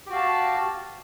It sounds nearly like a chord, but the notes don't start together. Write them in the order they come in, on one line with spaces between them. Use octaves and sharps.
G4 F#4 F5 A5